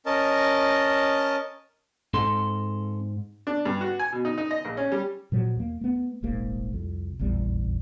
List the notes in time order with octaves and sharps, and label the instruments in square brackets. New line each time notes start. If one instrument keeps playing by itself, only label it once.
[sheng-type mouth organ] C#4 A#4 D#5 A5
[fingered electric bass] G#2 [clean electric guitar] C4 A4 C6
[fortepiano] D4
G2
F#4
G#5
B2
D#4
D#4
D#5
A#1
C#4
G3
[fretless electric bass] A#2 F3 F#3
D#2 A#3
A3 B3
D#1 G#1 G#2 A#3
C2 F2
F1 A#1 E2 G3